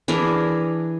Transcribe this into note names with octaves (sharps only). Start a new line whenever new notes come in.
E3 D4 G#4 A#4